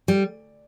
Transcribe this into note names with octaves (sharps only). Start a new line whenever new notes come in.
G3